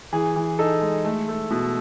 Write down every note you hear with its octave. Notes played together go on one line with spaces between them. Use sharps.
E3 G#4
E3
D#4 A4
G#3
A3
A3
B2